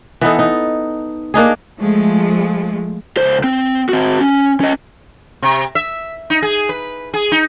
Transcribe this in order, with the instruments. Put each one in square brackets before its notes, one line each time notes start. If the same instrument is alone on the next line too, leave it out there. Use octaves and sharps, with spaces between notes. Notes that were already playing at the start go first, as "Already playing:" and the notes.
[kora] E3 B3 D#4 A4
D#4
A#3 D4 D#4 G#4
[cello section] F3 G#3 A3
[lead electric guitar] C#2 C5
C4
C4 F#4
C#4
C#4 D#5
[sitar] C3
E5
D#4
G#4
B4
G#4
D#4